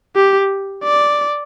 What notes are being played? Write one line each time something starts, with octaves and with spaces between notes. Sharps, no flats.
G4
D5